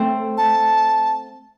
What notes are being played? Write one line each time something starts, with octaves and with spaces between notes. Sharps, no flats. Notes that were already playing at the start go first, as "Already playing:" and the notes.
Already playing: A3 C4
A5